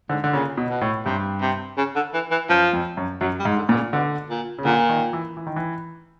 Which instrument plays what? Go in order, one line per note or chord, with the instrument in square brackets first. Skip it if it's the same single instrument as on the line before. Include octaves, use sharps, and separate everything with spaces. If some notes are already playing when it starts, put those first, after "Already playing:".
[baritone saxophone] G#2 [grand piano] D3
[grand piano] D3
[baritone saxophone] A#2 [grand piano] C#3
[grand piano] B2
[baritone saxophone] B2
[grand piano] A2
[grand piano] G2 [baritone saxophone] C3
[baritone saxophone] C3
C#3
D3
E3
E3
[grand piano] F#2 [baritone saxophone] F3
[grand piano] F2
F#2
[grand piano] F#2 [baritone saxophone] F#3
[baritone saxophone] G3
[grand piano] G#2
[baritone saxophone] D3
[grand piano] A#2 [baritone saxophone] D3
[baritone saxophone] C#3
[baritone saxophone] B2 [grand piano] D3
[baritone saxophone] A#2
[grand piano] C#3
[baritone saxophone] A#2 [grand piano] D3
[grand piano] D#3
E3
E3
D#3
E3